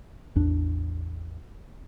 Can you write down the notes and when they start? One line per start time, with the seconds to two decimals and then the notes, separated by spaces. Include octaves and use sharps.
0.35 A1 E2 D4